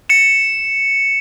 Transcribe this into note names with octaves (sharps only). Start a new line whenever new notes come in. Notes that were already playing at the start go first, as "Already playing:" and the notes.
C#7 E7